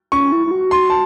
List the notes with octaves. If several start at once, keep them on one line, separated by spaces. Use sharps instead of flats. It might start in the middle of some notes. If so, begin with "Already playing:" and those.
C#4 C#6
E4
E4
F#4
C6
A5